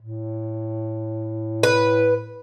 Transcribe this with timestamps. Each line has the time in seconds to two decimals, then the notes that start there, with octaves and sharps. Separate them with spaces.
0.02 A2
1.63 B4